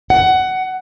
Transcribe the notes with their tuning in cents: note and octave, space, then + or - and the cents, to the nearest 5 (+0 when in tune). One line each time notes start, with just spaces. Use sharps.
F#5 +15